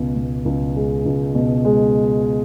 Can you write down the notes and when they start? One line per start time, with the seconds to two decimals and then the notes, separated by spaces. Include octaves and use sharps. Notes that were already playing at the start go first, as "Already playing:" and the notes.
Already playing: C#2 B2
0.16 B2
0.45 C#2
0.76 G#3
1.05 C#2
1.35 B2
1.65 G#3